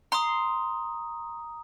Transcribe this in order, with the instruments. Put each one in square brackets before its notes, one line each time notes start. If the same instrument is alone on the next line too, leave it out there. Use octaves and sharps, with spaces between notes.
[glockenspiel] A#5 D#6 [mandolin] C6